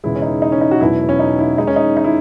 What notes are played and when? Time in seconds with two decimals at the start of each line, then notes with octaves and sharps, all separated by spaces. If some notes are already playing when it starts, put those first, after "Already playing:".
0.04 E1 E2 C#3 E3 G#3 E4
0.16 C#4
0.22 D#4
0.42 D#4
0.52 C#4
0.61 D#4
0.71 F#4
0.80 E1 E2 B2 F#3 E4
1.09 C#4
1.19 D#4
1.39 E4
1.58 D#2 D#3 G#3 D#4
1.67 C#4
1.76 D#4
1.97 D#4
2.04 E4